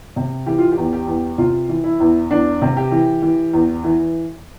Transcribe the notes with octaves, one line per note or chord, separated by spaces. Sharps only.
C3
E3 G4
F4
G4
E2
G4
E2
C3 F4
E3
E4
E2
E2 D4
C3
G4
E3
E3
E2
E3